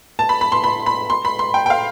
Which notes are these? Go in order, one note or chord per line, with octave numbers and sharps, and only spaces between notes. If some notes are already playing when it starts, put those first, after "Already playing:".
A5
B5
B5
C6
B5
B5
C6
B5
C6
G5
G5
F5